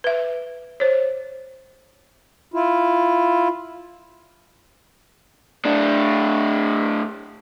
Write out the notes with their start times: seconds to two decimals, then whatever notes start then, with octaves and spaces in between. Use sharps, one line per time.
0.04 B4 E5
0.80 C5 C#5
2.54 E4 F4
5.65 A2 D4